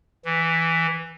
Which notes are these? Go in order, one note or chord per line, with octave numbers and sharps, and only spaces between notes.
E3